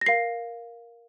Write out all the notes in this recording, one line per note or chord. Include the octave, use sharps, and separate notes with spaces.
A#6
A#4 F5 C7